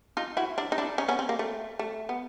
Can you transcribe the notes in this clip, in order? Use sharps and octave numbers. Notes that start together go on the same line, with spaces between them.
D#4 F4
E4 F#4
D4 E4
D#4
D4 E4
C#4 D#4
B3 C#4
C4
A#3
A3
A3
B3